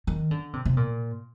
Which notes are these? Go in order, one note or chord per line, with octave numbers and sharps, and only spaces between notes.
D#3
D3
C3
C3
A#2